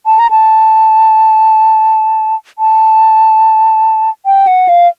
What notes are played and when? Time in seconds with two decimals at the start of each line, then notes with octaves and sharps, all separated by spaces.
0.06 A5
0.19 A#5
0.31 A5
2.59 A5
4.26 G5
4.47 F#5
4.69 F5